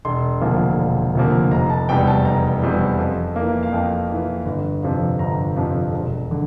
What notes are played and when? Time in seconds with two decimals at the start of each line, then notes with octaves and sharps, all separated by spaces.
0.05 E1 C6
0.41 D2 C3 F3 A#3
0.78 E1
1.15 D2 C3 F3 A#3
1.51 F1 A#5
1.70 A5
1.89 E2 C3 G3 G5
2.07 A5
2.25 F1 A#5
2.62 E2 C3 G3
2.98 F2
3.36 E3 A#3
3.63 F5
3.73 F2 G5
4.10 E3 A#3
4.46 G1
4.83 F2 C3 F3
5.19 G1 A#5
5.56 F2 C3 F3
5.92 E1
6.31 D3